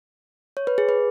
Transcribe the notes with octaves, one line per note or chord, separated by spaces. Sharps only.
C#5
B4
G#4
B4